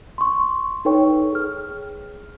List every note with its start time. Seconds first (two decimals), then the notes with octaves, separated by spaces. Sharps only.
0.18 C6 C#6
0.85 D#4 A4 B4 C#5 G5 C#6
1.33 G#4 F6